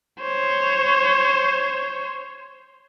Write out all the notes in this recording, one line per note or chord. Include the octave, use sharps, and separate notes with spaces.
C5 C#5